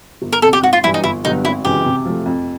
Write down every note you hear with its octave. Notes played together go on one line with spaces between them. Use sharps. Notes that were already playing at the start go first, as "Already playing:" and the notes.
G1
A#4
F2 C3 A4
G4
G#1 F#4
F4
G2 E3 G3 E4
D#4
G1 E4
G2 D3 F#3 B3 D#4
G#1 E4
F#2 C#3 E3 G#3 G4
C3
F3 A3
F2